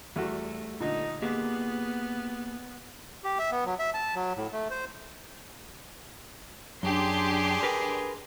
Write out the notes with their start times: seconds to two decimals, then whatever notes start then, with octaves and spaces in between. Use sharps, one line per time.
0.16 E2 G3 A3 F#4
0.80 A#2 D3 D#4
1.22 A#3 B3 G4 G#4
3.24 G4
3.39 E5
3.51 B3
3.66 F#3
3.79 E5
3.94 A5
4.15 F#3
4.36 A2
4.52 A3
4.70 C5
6.83 F#2 D4 G4 G#4 C6
7.63 A#4 B4